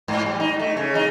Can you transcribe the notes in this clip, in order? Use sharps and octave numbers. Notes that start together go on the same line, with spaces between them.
G#2
G3
D#4
A3
C#3
D#4